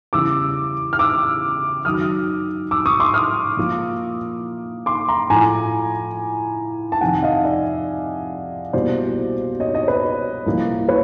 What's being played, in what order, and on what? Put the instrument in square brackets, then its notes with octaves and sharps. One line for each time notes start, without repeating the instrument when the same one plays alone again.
[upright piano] E2 C#3 E3 G3 D6 E6
F6
D6 E6
F#2 D#3 F#3 D#6 F6
D6 E6
C#6 D#6
C6 D6
D#6 F6
A#2 F3 A#3
C6 D6
A#5 C6
A2 F3 A3 G#5 A#5
A5
F2 C3 D#3 F#5 G#5
D#5 F5
D5 E5
C2 B2 G3 A#3 C5 D5
C#5 D#5
C#5 D#5
B4 C#5
C2 A#2 F3 A#3
B4 C#5